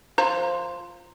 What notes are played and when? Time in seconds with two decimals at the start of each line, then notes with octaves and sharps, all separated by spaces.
0.18 F3 C5 A#5